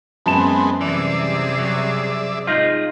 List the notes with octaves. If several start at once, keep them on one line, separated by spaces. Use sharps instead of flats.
F#2 G#3 B3 C4 A5 E7
C3 E3 G3 G#4 D5 E5
F#3
G#3 D#4 F4 F6 G6